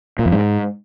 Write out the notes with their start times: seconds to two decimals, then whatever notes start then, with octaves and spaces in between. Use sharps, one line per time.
0.19 A#2
0.26 F2
0.32 G#2